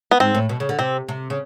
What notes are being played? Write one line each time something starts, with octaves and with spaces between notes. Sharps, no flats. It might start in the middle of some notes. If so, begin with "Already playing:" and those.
B3
G#2 C4
A2
B2
C#3
D3
C3 C4
C3
C#3